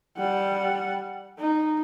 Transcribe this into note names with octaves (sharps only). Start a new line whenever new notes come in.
G3 F#5
D#4